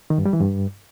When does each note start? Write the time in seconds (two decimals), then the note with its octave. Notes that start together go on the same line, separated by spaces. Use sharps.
0.10 D#3
0.18 G2
0.25 G3
0.33 E3
0.41 G2